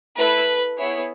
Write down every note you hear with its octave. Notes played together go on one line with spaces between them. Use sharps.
A3 E4 A4 B4
B3 E4 G#4 C#5